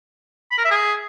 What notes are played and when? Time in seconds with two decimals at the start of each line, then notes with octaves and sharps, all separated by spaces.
0.51 B5
0.58 A#4
0.64 E5
0.71 G#4